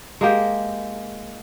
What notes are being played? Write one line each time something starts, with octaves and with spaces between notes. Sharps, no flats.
G#3 A#3 G4